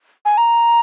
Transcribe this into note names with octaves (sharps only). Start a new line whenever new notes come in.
G#5
A#5